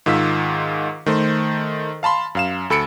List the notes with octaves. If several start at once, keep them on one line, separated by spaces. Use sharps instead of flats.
G#2 D#3 F4 E6 B6
D#3 A3 C5
F5 A5 B5 C6
F#2 F5 E7
D2 A4 B5 E6 C#7 D7